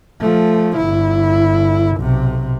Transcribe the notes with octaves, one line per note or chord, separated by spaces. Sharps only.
F3 A3
G1 E4
B1 C3